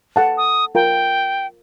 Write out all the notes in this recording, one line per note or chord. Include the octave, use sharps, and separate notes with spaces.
A4 F#5 A5
D#6
F4 A#4 G5 A#5